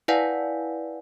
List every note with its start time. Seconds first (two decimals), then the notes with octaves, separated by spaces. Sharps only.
0.08 E4 B4 D5 F5 F#5 G#5